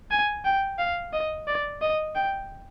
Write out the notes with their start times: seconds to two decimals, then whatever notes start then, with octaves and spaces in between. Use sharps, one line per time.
0.11 G#5
0.45 G5
0.79 F5
1.13 D#5
1.47 D5
1.82 D#5
2.15 G5